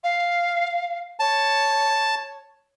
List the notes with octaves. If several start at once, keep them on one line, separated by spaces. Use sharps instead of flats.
F5
C#5 A5